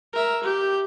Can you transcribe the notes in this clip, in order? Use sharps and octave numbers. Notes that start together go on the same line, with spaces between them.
A#4 E5
G4